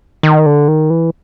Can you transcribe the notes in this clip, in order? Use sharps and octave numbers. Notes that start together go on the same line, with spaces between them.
D#3
D3
D#3
E3